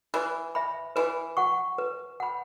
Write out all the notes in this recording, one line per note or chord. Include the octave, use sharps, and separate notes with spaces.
E3 B4
E5 B5
E3 B4
F#5 C#6
B4
F#5 B5